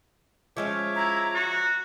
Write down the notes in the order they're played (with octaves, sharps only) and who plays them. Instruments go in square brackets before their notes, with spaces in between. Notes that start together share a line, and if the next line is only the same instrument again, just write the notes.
[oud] F3 G#3 C#4 [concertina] C#5 E5 D6
[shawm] E4 [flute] A#5
[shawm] F#4